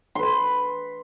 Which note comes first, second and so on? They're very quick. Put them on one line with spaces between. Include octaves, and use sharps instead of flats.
C6 B4 B5